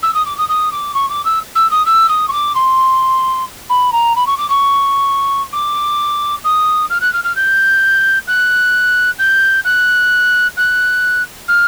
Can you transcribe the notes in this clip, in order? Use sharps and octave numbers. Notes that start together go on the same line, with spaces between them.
E6
D#6
D6
D#6
D#6
D6
C#6
D6
E6
E6
D#6
E6
D#6
C#6
D6
C6
B5
A#5
B5
C#6
D6
C#6
D6
D#6
F6
F#6
F6
F6
G6
F#6
G6
F#6
F#6
F6